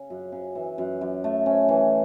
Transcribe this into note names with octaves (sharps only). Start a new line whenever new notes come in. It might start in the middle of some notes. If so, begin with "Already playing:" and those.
Already playing: C#3
F#2
C#3
E3
F#2
F#2
A3
C#4
E3